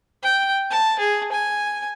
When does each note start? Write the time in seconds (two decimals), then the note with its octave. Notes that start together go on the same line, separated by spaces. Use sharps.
0.23 G5
0.70 A5
0.99 G#4
1.32 G#5